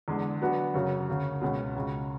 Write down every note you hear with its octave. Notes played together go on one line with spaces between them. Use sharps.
E2 D3 G#3
D3 F#3 B3 F#4
F#2 C#3 F#3
D2 C#3 F#3
C#2 B2 G#3 C#4
C#2 C#3 G#3